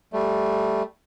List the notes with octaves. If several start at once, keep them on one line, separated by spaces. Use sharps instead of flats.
G3 A3